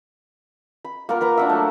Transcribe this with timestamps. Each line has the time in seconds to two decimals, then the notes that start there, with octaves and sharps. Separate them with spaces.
0.85 B5
1.09 A#3 F4 A#4 F#5
1.21 A#4 B4 A#5
1.38 D4 F#4 A#4 E5 F#5
1.49 F#3 A3